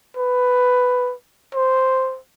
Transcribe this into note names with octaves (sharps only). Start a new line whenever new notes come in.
B4
C5